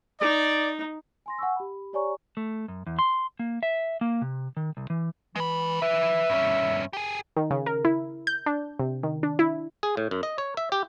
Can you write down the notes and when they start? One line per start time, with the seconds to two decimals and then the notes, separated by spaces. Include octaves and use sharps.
0.21 D#4 D5
1.26 G#5 C6 A#6
1.38 F#5 G#5 C#6 E6
1.56 G4 B5
1.93 G4 C#5 D5 G#5 A#5 C#6
2.37 A3
2.68 F#2
2.87 E2
2.99 C6
3.39 A#3
3.63 E5
4.01 A#3
4.21 C3
4.57 D#3
4.77 C2
4.90 E3
5.36 E3 G#3 B5
5.82 E3 B4 E5
6.30 G2 C#4
6.93 G4 G#4
7.36 D#3
7.51 C#3
7.66 A#4
7.85 E4
8.27 G6
8.46 D4
8.80 C3
9.03 D#3
9.23 D4
9.39 E4
9.83 G#4
9.97 A2
10.11 F#2
10.23 D#5
10.38 C#5
10.57 E5
10.72 G4